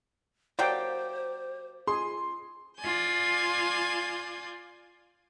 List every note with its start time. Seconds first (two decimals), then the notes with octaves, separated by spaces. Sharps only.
0.59 F#3 A#3 G4 C5 D5 G5
1.87 F4 G#4 C6
2.79 F4 D5 G#5 G6